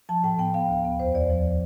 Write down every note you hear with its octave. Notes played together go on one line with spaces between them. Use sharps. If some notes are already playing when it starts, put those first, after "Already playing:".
F3 A5
A2 G5
B3 G5
B3 F5
D2
B3
E2 C5
E2 D5
F3